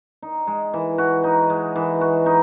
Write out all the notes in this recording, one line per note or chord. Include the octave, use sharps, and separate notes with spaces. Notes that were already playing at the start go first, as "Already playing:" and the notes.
D#4
G#3
E3
F#4
D#4
G#3
E3
F#4
D#4